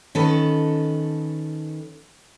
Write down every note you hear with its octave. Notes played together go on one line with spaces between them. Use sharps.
D#3 C#4 A4 B4